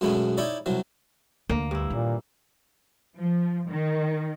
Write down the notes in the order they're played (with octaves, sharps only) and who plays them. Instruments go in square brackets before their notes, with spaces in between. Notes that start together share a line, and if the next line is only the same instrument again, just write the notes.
[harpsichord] F#2 B2 G#3 A3 B3 C#4
D#4 E4 G4 C#5 D5
C2 C3 F#3
[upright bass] D2 [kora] A#3
[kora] G2 E4
[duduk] A#2 [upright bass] D#3
[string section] F3
D#3